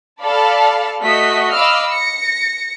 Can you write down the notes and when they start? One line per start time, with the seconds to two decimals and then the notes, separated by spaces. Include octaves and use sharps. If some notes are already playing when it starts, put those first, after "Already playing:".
0.22 A4 D5 F5 A5 B5
1.01 A3 F#4 D#5 B6
1.54 D#5 F5 B5 D6 E6 F6
1.92 A#6 C#7